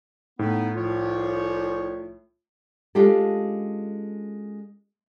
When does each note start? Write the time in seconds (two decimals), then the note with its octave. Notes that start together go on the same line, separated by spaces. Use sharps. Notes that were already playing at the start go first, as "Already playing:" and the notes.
0.39 A2 A3 B3 D#4
0.75 C2 F3 F4 C#5
2.95 G#3 C#4 D4 F4 G4 A4